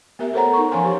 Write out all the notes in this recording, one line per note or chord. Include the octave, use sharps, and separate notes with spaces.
B3 G4 A#4 E5
A4 A#4 C5 C#5 F#5 A#5
D#4 A#4 C#6
F3 C#4 F5 G#5 C6
G4 C5 C#5